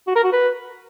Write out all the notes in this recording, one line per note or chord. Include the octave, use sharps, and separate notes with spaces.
F#4
A#4
F#4
B4